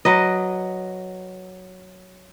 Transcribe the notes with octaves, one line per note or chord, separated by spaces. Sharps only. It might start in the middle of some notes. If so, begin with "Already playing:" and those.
F#3 B4 D#5